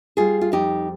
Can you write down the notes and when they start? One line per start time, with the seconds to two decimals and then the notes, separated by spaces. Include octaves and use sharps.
0.17 G3 F4 G#4
0.41 F4
0.52 F2 D#4 G4